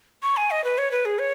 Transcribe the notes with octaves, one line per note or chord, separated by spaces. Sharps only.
C#6
G#5
D#5
B4
C#5
B4
G#4
C#5